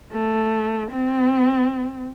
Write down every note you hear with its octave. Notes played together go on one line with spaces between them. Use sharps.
A3
C4